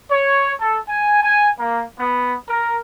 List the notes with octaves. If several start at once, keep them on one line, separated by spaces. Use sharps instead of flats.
C#5
A4
G#5
G#5
A#3
B3
A#4